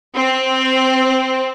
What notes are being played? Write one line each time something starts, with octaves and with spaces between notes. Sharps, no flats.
C4